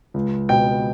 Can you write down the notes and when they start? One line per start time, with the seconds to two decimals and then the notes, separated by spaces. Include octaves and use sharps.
0.14 C#2
0.49 B2 G5